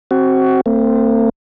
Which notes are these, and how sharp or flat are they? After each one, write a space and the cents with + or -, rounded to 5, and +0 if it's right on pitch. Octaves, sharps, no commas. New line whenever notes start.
C4 +20 F#4 +20
A3 +45 C4 +0